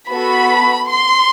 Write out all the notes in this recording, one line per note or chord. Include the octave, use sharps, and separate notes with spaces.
B3 F#4 A4 B5
C6